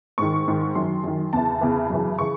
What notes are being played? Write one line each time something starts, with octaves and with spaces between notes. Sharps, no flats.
G#2 D#3 C#6
G#2 D#3
F#2 D#3 C6
F#2 D#3
E2 C#3 E3 A5
E2 C#3 E3
F#2 C#3 E3
C#3 E3 C#6